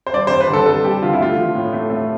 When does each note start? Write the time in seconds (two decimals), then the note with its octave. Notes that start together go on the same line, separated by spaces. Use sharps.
0.07 C5
0.13 G2 D5
0.27 G2 C5
0.40 B4
0.49 D3 A4
0.66 G2 A4
0.84 G3 G4
1.02 D3 F4
1.13 E4
1.20 A3 F4
1.38 F3
1.55 A2
1.73 A3
1.90 A3